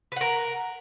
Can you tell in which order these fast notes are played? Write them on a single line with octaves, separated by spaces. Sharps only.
B4 F#5 A#4